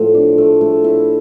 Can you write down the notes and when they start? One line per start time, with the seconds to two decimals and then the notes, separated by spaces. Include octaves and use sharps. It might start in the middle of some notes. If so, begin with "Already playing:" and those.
Already playing: A2 F3 A3
0.14 D4
0.38 A3
0.61 A3
0.84 E4